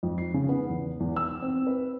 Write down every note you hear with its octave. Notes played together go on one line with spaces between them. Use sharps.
F2
C7
C#3
B3
E2
E2
E6
C4
B4